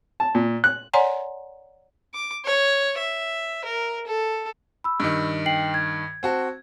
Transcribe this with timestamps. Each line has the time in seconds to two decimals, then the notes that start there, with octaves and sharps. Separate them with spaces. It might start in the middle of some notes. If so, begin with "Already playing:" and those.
0.20 A5
0.35 A#2
0.64 F#6
0.93 C#5 D5 F#5 G#5 A#5 C6
2.14 D6
2.45 C#5
2.98 E5
3.65 A#4
4.07 A4
4.84 B5 E6
5.00 G2 D#3
5.46 G5 C7 F#7
5.74 G#6
6.23 C4 F#4 A5